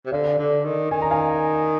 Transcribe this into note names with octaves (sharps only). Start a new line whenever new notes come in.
C3
D3 D5 F5
D3
D#3
D#3 G#5
A#5
F5 G#5